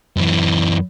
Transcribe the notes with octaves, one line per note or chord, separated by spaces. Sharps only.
F#2 E3